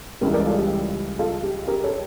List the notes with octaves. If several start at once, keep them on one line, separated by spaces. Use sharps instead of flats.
C#2 C#3 E3 G3 G4 A#4
A#4 D5
F4 A4
G4
F4 A4
G4
G4 A#4
A4 C#5